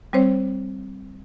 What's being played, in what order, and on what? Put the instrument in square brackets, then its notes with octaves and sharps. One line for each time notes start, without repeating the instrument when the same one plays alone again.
[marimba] G3 C4 C5 C#5